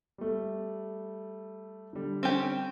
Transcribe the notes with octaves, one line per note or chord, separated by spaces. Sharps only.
G3 A3
D3 G3
C4 C#4 G4